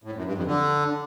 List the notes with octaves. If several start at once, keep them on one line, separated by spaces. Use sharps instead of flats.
A2
F#2
G2
F2
D3